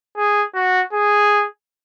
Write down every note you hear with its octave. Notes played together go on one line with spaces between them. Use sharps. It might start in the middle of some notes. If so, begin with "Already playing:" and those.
G#4
F#4
G#4